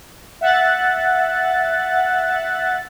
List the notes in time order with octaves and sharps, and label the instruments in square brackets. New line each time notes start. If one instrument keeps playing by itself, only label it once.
[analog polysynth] E5 F#5 F#6 A6